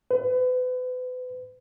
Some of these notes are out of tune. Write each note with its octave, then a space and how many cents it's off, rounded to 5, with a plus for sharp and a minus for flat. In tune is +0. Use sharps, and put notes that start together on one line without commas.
B4 +35